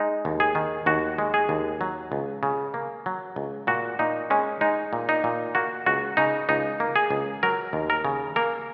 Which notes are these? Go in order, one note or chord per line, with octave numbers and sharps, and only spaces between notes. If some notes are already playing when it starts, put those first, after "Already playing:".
Already playing: G#3 D#4
D#2
G#4
D#3
D#2 F#4
G#3
G#4
D#2
F#3
C#2
C#3
A#3
F#3
C#2
A#2 F#4
A#2 D#4
G#3 C#4
G#3 D#4
A#2
D#4
A#2
A#3 F#4
C#2 F#4
C#3 D#4
C#2 D#4
A#3
G#4
C#2
F#3 A#4
D#2
A#4
C#3
A#3 A#4